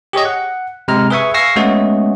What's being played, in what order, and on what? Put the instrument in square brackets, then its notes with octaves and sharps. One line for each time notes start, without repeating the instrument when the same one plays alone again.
[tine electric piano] G4 G#4 C#5 D#5
F#5
C3 G#3 A#5 F6
G#4 B4 E5 G#5 C#6
F5 G#5 C#6 E6 A#6 C7
G#3 A3 B3 C#4 F#4 G#4